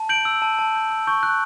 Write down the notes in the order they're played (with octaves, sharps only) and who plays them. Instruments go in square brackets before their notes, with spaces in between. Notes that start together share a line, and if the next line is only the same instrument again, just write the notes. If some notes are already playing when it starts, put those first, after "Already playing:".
Already playing: [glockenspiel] A5
G6 D7 F#7
E6
A5
A5
G6
E6
C#6 G6
F#6